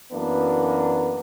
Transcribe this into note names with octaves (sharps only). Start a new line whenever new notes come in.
F#2 E3 A#3 B3 D4